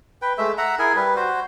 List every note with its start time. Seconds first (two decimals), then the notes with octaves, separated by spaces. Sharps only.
0.22 B4 G5
0.38 G#3 A3 E5
0.58 E5 F#5 A#5
0.79 E4 G#4 A#4 G#5
0.96 G3 B4
1.16 F#4 C5